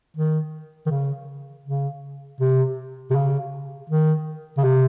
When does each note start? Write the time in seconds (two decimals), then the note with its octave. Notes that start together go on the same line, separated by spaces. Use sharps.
0.17 D#3
0.86 D#3
0.90 C#3
1.66 C#3
2.40 C3
3.10 C3
3.15 C#3
3.90 D#3
4.57 C#3
4.64 C3